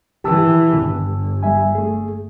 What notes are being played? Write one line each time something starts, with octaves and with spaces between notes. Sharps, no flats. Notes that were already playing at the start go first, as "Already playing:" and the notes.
E3 G4 A5 E6
G1
G3 E5 G#5
A3 G#4